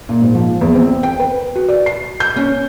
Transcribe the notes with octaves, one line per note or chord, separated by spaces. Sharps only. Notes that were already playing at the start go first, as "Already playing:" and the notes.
A#2
G#2
F3
E2
C4
G5
B4
F#4
D5
C7
G6
C#4